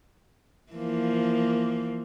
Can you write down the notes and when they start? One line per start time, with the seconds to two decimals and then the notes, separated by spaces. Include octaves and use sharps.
0.73 E3 F3 A#3